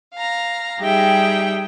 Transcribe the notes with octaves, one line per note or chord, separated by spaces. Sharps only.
F5 A#5
G3 D#4 G4 G#4 E5 G5